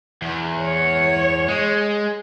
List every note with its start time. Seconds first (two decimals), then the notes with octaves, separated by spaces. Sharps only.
0.22 E2
0.62 C#5
1.48 G#3